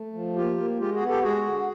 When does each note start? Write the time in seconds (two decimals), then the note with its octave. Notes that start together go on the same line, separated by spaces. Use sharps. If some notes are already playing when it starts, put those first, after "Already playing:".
Already playing: A3
0.13 F3
0.35 A#3 F4 G4
0.57 A#3
0.79 G#3 F4 G4
0.94 F#4 G#4
1.01 B3
1.09 G4 A4
1.23 G#3 F#4 G#4
1.46 D3